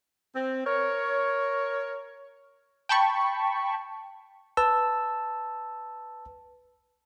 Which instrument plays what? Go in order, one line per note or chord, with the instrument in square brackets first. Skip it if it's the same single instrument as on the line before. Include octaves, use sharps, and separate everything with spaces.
[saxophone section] C4
A#4 C#5
[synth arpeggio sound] G5 A5 B5 C#6
[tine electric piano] B4 A5 E6